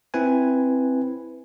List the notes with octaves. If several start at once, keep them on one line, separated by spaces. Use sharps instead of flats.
C4 E4 B4 G#5